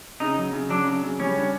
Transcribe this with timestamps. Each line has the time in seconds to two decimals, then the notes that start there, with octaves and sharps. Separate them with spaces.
0.20 C#3 D#4
0.37 F#3
0.53 C#3
0.69 F#3 D4
0.87 C#3
1.03 C#3
1.20 G3 C#4
1.37 D4